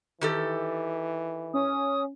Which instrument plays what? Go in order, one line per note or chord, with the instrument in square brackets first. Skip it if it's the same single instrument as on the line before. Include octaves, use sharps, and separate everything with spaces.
[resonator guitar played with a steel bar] D#3 G4 A4 [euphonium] E3
[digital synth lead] C#4 [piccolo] D#6